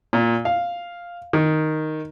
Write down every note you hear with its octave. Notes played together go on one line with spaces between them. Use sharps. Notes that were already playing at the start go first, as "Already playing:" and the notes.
A#2
F5
D#3